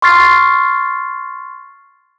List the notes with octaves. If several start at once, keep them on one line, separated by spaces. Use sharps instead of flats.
C6 C#6 F6 A6 C7